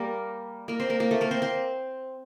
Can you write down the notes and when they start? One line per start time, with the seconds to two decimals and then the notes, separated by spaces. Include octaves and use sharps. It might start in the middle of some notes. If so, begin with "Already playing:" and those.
Already playing: G3 A#3 G4 A#4
0.68 A#3 A#4
0.80 C4 C5
0.90 A#3 A#4
1.00 A#3 A#4
1.11 A3 A4
1.21 A#3 A#4
1.31 C4 C5
1.42 C4 C5